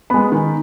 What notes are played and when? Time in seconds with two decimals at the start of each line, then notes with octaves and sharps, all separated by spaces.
0.10 G#3 B3 B5
0.32 D#3